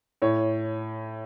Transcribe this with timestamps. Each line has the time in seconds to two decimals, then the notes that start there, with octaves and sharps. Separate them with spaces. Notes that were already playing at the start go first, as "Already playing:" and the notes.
0.22 A2 C#5